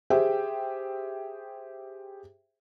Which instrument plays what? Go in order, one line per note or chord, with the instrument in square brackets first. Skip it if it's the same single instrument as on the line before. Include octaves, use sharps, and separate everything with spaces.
[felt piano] G4 G#4 C5 E5 G5